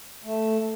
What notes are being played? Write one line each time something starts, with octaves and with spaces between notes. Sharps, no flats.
A3